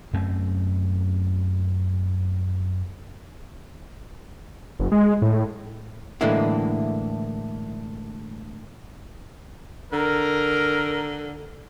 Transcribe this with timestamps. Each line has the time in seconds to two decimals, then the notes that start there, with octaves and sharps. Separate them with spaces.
0.13 F#2 A3 C4 C#4
4.79 F#1
4.92 G#3
5.22 A2
6.21 A2 D3 E3 G#3 A#3 E4
9.93 D3 A#4